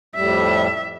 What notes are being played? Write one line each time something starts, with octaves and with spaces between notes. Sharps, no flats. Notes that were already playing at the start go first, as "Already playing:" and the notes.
F2 A2 G3 E5